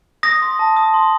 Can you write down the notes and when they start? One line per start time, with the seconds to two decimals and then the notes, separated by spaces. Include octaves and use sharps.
0.23 D#6 A#6
0.42 C6
0.59 A5
0.77 D#6
0.94 C6